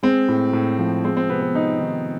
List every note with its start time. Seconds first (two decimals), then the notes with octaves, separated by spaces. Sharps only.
0.03 G#3 C4
0.29 A2
0.53 A2
0.79 F3
1.04 G#3 C4
1.17 C4
1.30 C3 B3
1.41 B3
1.55 C3 D#4
1.80 D#3